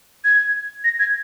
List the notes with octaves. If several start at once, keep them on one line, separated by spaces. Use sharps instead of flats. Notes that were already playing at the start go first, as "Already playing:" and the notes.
G#6
A#6
G#6